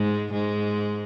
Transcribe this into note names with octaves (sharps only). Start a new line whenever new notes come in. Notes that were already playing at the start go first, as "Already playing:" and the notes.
Already playing: G#2 G#3
G#2 G#3